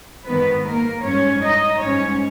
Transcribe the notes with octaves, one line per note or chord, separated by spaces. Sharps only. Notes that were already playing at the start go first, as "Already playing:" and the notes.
G#2 D#3 G3 B3 B4
A#3 A#4
G#2 G3 C#4 C#5
D#4 D#5
G#2 G3 C#4 C#5